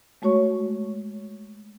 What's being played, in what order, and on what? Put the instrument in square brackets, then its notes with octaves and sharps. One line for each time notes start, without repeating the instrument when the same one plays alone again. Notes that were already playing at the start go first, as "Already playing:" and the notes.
[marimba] G#3 A3 F#4 C#5 C#6